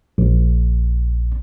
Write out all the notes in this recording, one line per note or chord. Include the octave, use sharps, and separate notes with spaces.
A#1